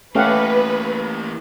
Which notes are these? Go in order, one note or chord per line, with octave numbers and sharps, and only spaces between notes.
E3 A3 A#3 C#4 G4 B4 F5 F#5